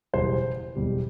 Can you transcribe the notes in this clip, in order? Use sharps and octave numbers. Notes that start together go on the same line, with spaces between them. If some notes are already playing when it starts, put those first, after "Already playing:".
F#1 E2 B2 G3 C5
F#1 E2 B2 G3